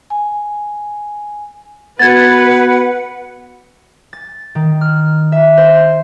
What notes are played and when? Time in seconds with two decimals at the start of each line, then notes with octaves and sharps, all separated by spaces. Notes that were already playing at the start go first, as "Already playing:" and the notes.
0.10 G#5
1.99 B3 F#4 B4 F#5 G#6 A6
4.13 A6
4.55 D#3
4.81 F6
5.32 E5
5.57 C5